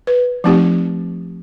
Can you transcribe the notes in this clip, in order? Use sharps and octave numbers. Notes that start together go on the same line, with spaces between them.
B4
F3 A3 C4 D#4 G4